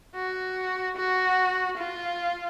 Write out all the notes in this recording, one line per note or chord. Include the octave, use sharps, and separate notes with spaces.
F#4
F#4
F4